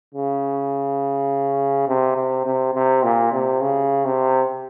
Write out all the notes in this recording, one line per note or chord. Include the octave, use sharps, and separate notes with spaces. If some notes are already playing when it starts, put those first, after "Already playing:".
C#3
C3
C3
C3
C3
A#2
C3
C#3
C3